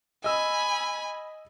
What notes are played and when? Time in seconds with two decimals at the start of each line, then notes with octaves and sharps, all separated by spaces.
0.24 D#5 G#5 B5 E6